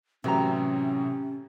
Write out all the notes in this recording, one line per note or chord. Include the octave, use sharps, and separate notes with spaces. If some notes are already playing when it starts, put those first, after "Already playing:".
A2 C3 E3 F#3 C#4 E5 A#5